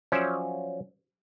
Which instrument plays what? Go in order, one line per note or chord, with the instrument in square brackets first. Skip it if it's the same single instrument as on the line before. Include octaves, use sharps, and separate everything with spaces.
[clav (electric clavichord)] F3 F#3 C#4 C5 D5 E5